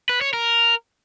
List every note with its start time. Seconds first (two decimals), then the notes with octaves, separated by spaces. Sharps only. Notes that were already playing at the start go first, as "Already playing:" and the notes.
0.09 B4
0.21 C#5
0.33 A#4